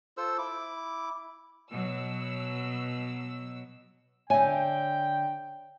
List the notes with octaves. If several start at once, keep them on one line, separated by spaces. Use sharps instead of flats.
F4 A4 C5 E6
E4 D6
B2 F#3 E6
D3 C#5 E5 G5 G#5